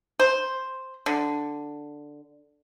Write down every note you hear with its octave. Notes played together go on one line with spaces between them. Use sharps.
C5
D3